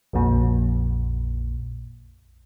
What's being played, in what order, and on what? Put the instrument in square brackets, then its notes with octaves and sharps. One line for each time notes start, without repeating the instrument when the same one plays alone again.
[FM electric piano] A#1 F2 A#2